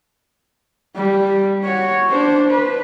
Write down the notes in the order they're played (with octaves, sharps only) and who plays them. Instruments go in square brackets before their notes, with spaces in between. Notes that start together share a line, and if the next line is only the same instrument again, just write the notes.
[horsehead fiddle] G3
F#4 C#5
D4 C5
B4